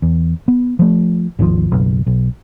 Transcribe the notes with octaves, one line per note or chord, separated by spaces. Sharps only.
E2
B3
F3 A3
G#1 D#2 C3 F3
F#1 B1
B1